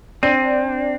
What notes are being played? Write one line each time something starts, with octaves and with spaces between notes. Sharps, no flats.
C4 D4 D#7